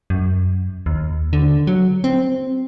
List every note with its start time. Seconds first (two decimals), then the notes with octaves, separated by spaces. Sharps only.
0.10 F#2
0.86 D#2
1.33 D3
1.67 F#3
2.04 C4